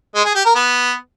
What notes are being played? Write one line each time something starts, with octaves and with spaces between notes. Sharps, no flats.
G#3
G#4
G4
A#4
B3